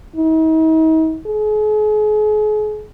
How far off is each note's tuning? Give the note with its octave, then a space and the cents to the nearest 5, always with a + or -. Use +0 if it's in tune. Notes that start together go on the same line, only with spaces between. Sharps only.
D#4 +45
G#4 +40